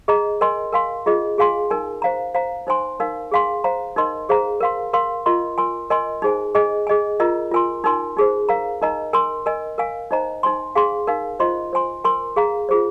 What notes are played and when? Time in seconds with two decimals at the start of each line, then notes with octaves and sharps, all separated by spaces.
0.08 G#4 D#5 A#5
0.41 A#4 D#5 G#5 C6
0.73 A#4 F5 G#5 C6
1.06 F4 G#4 D#5
1.38 G#4 F5 G#5 C6
1.71 D#4 A#4 G#5
2.02 C5 F5 A#5
2.34 C5 F5 A#5
2.67 D#4 C5 G#5 C6
3.00 D#4 A#4 F5
3.32 G#4 F5 G#5 C6
3.64 C5 F5 A#5
3.96 D#4 A#4 D#5 C6
4.29 G#4 C5 F5 A#5
4.60 A#4 F5 C6
4.93 A#4 F5 C6
5.26 F4 A#4 D#5 C6
5.58 A#4 G#5 C6
5.90 A#4 D#5 G#5 C6
6.22 D#4 G#4 C5 G#5
6.55 G#4 D#5 G#5
6.87 G#4 D#5 G#5
7.20 F4 A#4 D#5 A#5
7.51 F4 A#4 G#5 C6
7.84 D#4 A#4 G#5 C6
8.17 D#4 G#4 C5
8.49 A#4 F5 A#5
8.82 D#4 A#4 D#5 A#5
9.13 A#4 G#5 C6
9.46 A#4 D#5 G#5
9.78 A#4 F5 G#5
10.11 D#4 C5 D#5 A#5
10.43 D#4 C5 G#5 C6
10.75 G#4 F5 G#5 C6
11.07 D#4 A#4 F5
11.40 F4 C5 D#5 C6
11.73 C5 G#5 C6
12.04 A#4 G#5 C6
12.36 G#4 F5 A#5
12.69 F4 G#4 C5